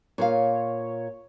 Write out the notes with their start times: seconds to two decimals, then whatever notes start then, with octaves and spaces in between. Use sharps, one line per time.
0.18 A#2 F4 C#5 F5